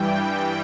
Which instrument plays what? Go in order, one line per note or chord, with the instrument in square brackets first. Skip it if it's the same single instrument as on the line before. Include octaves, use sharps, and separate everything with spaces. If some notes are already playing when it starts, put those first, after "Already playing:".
Already playing: [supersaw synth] G2 E3 G3 G5